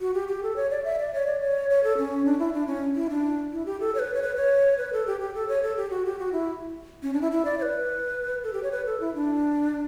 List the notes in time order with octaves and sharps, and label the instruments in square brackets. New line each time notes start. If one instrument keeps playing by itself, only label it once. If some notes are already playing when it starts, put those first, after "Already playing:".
[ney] F#4
G4
G4
A4
C#5
D5
E5
D5
C#5
D5
C#5
C#5
A4
C#4
D4
E4
D4
C#4
E4
D4
E4
G4
A4
C#5
B4
C#5
B4
C#5
B4
A4
G4
G4
A4
C#5
A4
G4
F#4
G4
F#4
E4
C#4
D4
E4
E4
D5
C#5
B4
A4
G4
C#5
B4
A4
E4
D4